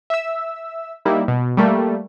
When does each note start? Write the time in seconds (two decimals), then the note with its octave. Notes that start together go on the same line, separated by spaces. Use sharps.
0.10 E5 E6
1.05 G3 A#3 D#4 E4
1.28 B2
1.57 G3 A3 A#3